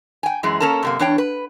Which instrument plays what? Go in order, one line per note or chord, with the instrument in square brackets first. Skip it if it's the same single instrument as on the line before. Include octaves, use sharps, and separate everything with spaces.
[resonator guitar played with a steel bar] G5 G#5
F#2 E3 G#3
A#3 C#4 A4 A#4 A5
F#2 C3 A#3
E2 D4 C#5 G5
B4